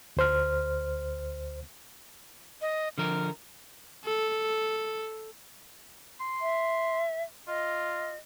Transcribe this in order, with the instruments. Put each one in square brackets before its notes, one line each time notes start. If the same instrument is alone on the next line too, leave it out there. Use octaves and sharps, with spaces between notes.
[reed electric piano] D2 C5 F6
[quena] D#5
[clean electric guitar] D3 F3 A#4 [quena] F6
[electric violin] A4
[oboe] C6
[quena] E5
[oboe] F4 [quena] D#5